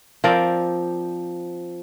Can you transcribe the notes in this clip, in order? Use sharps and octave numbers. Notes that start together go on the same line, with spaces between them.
F3 C4 A#4 D5